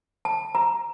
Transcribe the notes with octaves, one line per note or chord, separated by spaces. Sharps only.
A5
A#5